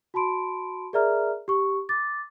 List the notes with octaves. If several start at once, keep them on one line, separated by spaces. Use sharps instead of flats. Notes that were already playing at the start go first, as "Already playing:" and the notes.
F#4 A5 B5 C6 D7
G#4 A#4 D5 E5 A#5 F6
G4 C#6
D6 A6